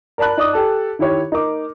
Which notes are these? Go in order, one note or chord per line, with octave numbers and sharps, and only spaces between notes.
A#4 D5 A5 B5 F#6
D#4 D5 D6 D#6
G4 A4 A5
D#3 E4 G4 C#5
D#4 A#4 D6